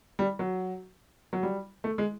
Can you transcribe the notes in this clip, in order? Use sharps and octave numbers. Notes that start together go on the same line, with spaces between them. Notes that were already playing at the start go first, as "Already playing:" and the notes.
G3
F#3
F#3
G3
A3
G#3